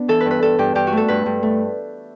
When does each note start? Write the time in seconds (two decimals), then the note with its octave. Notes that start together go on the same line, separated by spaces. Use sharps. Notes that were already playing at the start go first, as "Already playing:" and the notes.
Already playing: B3 D4
0.08 E3 A4
0.21 B4
0.26 G2
0.31 B4
0.42 G2 A4
0.59 G2 G4
0.75 G2 G4
0.87 F#4
0.93 A3 A4
1.08 G2 B4
1.26 G2
1.43 A3